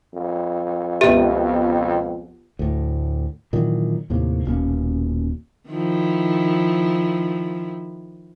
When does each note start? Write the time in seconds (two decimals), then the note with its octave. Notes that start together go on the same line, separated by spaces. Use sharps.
0.14 F2
1.01 C#2 B2 G4 B4 E5
2.59 D2 A2
3.53 A#2 D#3 E3 F#3
4.10 D#2 A2 C3 A#3
4.45 D#1 B2 A#3 C#4
5.69 D#3 F3 E4